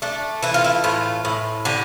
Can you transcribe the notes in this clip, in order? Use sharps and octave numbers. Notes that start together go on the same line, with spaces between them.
A3 D4
E3 E4
F4
E4
A2 F4
A2
D3 G4